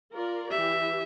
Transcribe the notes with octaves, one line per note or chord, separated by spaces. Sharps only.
F4 A#4 D5
E3 G4 E5